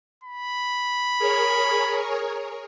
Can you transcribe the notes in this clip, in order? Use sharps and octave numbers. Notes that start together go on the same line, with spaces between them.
B5
G#4 A#4 C#5